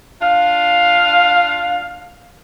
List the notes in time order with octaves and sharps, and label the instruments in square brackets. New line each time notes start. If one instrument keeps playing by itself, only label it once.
[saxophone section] D4 F4 F5